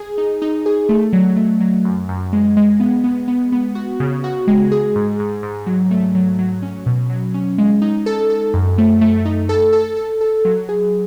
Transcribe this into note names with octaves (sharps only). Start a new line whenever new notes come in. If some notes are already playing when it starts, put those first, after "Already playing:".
Already playing: G#4
D#4
D#4
G#4
A3
F#3
A3
F#3
F#2
F#2
G#3
G#3
B3
B3
B3
B3
F#4
C#3
F#4
G#3
G#4
G#2
G#2
G#2
F#3
A3
F#3
F#3
C#4
B2
F#3
C#4
G#3
D#4
A4
A4
F#2
A3
A3
D#4
A4
A4
A4
A4
F#3
G#4